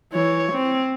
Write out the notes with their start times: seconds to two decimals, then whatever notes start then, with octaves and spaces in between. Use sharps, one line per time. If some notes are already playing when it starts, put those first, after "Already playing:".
0.13 E3 C#5
0.52 C4